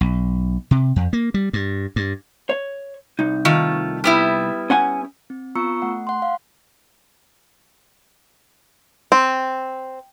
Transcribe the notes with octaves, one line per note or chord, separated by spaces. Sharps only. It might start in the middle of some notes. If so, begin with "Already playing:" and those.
B1
C3
F2
A#3
G3
G2
G2
C#5
C2 D#4
D#3 A3 F4
G3 B3 E4
C#4 F#5 G#5
C4
B3 F4 A#5 C#6 E6 C#7
A3 F#5
F#5 C6
F5
C4